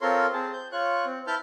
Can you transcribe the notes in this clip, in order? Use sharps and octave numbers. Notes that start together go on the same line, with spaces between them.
C4 F4 A4 A#4 C#5 C6
C4 G#4 A5
G6
F4 C#5 C#6 F#6
C4
E4 B4 A5 F6 G6